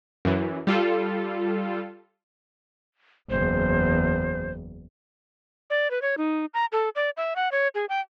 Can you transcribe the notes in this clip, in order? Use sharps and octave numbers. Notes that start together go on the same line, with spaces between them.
F#2 E3
G3 F4 A4
F#1 E2 C5
D5
B4
C#5
D#4
A#5
A4
D5
E5
F#5
C#5
G#4
G5